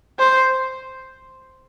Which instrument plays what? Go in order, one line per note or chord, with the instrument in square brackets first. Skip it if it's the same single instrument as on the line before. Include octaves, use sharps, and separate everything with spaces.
[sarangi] C5